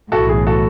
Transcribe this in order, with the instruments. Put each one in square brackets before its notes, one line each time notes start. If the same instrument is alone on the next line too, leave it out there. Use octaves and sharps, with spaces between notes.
[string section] B1 A2 E3 [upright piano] F#4 A4
[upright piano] G#4
F#4 A4